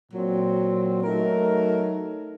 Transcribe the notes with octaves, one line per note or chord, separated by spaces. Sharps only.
A#2 F#3 C4
F#3 A3 D#4 A#4